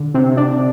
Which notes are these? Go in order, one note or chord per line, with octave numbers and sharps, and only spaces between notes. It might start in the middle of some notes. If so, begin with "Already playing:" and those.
Already playing: D3
C3
D4